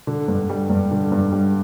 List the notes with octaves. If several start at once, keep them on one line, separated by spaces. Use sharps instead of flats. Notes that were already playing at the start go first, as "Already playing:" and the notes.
D3
G2
G3
G2
D3
G2
G3